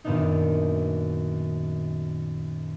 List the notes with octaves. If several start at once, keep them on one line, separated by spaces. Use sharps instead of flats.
F#2 A#2 D#3 B3 D4 D#4